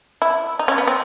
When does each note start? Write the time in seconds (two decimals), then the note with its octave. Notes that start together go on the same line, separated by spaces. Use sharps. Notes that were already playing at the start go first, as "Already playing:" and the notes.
0.22 E4
0.59 D#4
0.68 C#4
0.78 B3
0.88 C4